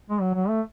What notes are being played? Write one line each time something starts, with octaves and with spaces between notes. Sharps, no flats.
G#3
F#3
F#3
A3